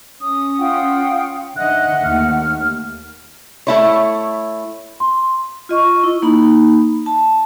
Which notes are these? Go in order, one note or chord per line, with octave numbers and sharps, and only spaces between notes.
C#4 D#6
F4 F#5 G5
D3 D#3 D#5 E5 F#5 F#6
D#2 A3 F6
A3 E4 C#5
C6
F4 D#5 C#6
E4
A#3 D#4 B5
A5